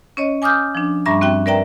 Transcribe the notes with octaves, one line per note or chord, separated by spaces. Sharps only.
C#4 C#5 D#5
G#5 D6 D#6 F6 G6
F3 D4
G2 G3 D4 E5 A#5 C#6
C4 F#4 E5 G5
A#4 B4 D5 E5 G5 A#5